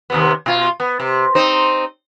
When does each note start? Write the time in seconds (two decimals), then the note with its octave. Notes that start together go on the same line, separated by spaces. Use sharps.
0.10 D#2 C3 B3
0.46 B2 F4
0.80 B3
1.00 C3
1.35 C4 D#4 C5